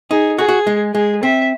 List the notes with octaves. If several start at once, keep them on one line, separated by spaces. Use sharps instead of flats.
D#4 G#4
F#4 G#4
F#4
G#3
G#3 G#4
C4 E5